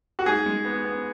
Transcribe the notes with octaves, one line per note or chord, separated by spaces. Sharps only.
F#4
G#2 G#4
G#3
B3
B3